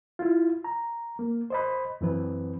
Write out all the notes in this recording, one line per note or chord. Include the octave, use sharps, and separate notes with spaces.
E4 F4
A#5
A#3
C5 D#5 B5
F#2 E3 C4 B4